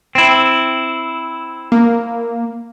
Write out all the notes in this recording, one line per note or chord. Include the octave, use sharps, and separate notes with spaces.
C4 E4
A#3